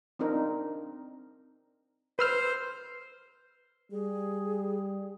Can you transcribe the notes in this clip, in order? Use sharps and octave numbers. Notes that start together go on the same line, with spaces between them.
C4 D4 D#4 A#4
B4 C5 E6 F6
G3 G#4